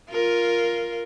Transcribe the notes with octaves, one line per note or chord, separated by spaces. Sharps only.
F4 A#4